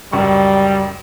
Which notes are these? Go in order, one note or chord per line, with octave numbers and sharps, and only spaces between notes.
C#2 F#2 G3 C#6